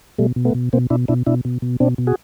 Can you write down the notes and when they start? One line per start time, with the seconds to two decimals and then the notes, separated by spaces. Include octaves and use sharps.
0.18 B2 G3 A3
0.36 B2
0.45 A3 B3
0.55 B2
0.73 B2 A#3 C4
0.90 B2 D4 E4
1.08 B2 D4 E4
1.26 B2 D4 E4
1.45 B2
1.62 B2
1.80 B2 C4 D4
1.98 B2
2.07 F#4 G#4